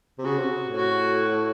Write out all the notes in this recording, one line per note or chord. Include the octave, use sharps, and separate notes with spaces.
C3
C#3 F#4
C3
A2
F#4